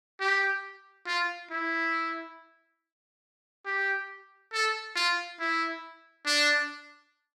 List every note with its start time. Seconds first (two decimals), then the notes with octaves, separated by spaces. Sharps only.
0.20 G4
1.07 F4
1.50 E4
3.65 G4
4.53 A4
4.95 F4
5.39 E4
6.26 D4